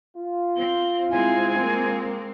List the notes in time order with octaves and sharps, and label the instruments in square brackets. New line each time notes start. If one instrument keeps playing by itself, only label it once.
[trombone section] F4
[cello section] C4 [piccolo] G7
[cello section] G#3 C4 [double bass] E4 [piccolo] G#5
[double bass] A#3